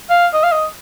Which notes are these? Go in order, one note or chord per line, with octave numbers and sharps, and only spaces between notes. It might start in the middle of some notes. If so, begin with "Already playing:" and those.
F5
D#5
F5
D#5